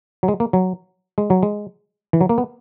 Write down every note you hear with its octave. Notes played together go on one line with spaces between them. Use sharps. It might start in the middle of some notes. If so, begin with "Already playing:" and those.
F#3
G#3
A#3
F#3
G#3
F#3
G#3
E3
F#3
A#3
B3